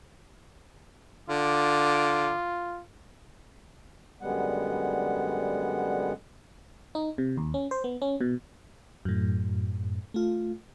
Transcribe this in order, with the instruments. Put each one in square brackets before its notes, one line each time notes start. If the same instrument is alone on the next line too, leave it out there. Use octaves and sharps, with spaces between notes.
[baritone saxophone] D3 [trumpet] F4 [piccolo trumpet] D6
[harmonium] F#2 D3 G3 G#3 B3 F#5
[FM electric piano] D#4
C3
D#2
C#4
C5
B3
C#4
B2
F#2 A2
A3 F4